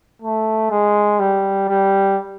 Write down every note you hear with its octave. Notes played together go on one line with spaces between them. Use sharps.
A3
G#3
G3
G3